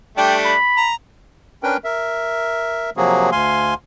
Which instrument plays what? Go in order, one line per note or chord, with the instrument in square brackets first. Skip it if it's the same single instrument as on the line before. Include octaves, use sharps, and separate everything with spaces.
[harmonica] G3 A3 D4 [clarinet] G5
[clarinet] B5
[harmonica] A#5
[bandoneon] C#4 D4 A#4 B4 G5
A#4 E5
C3 F3 F#3 A#3 F#4 G#4
D2 F5 G#5 C6